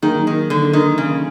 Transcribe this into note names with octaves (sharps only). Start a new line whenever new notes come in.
D#3 F#3 A#3 D#4 G#4
D#3
D3
D#3
C#3